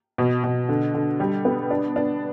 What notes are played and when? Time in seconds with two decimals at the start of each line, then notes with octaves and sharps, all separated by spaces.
0.18 B2
0.44 B2
0.69 D3
0.94 D3
1.20 G3
1.45 B3
1.71 D4
1.96 D4